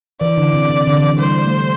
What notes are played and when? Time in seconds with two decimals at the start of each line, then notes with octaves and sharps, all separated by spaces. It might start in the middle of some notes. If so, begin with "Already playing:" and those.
0.21 E3 D5
0.38 D3
0.54 C3
0.70 C3
0.87 D3
1.03 E3
1.19 G3 C5
1.45 A3